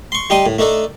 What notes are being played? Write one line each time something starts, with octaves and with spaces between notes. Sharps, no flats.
C6 C#6
G3 D#4 G5 C6 D#6
A2
A3 D4 D#4 A4